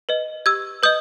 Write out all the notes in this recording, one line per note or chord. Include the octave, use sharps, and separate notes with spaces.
B4 D#5
G4 E6 G#6
B4 D#5 D#6 G6